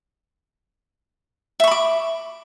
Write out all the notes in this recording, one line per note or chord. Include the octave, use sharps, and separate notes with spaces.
E5 B5 C#6 D6